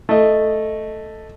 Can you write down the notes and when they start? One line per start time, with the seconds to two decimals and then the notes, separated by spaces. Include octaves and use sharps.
0.09 A3 D#5